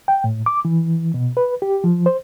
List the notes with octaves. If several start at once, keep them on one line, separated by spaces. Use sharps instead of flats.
G5
A2
D6
E3
B2
B4
G4
F3
C5